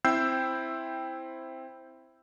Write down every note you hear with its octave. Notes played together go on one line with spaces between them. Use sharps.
C4 E4 G5 E6 G6 C7